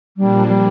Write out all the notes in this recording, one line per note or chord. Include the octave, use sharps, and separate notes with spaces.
A#2 F3 G3 A#3 D4
G3